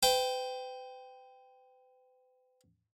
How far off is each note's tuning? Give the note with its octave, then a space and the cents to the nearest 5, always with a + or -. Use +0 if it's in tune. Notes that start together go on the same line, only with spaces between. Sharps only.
B4 +45 G5 +0